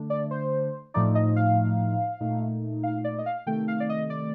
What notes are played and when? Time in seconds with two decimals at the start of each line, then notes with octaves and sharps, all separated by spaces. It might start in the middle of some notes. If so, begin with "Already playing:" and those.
Already playing: D3 A3 D4
0.10 D5
0.31 C5
0.94 A2 F3 A3 D#4 D5
1.15 D#5
1.36 F5
2.20 A#2 A3 D#4
2.83 F5
3.04 D5
3.18 D#5
3.26 F5
3.46 C3 D#3 A3 G5
3.68 F5
3.80 D5
3.89 D#5
4.10 D5